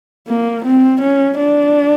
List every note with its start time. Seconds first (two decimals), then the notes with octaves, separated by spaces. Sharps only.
0.28 A#3
0.65 C4
1.01 C#4
1.38 D4